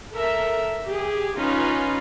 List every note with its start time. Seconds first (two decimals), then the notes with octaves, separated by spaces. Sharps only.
0.12 A4 A#4 E5
0.88 G4 G#4
1.36 C#4 D#4 F4 B4